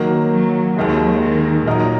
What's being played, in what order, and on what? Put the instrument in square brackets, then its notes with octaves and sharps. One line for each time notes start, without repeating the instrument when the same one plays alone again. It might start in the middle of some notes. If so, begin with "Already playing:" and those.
Already playing: [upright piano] D#3 F#3 A#3
[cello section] F#3
[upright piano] D#2 D#3 G#3 [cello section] F#3
[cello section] D#3
[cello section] A#2 [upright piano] F#3 D#4 A#4 D#5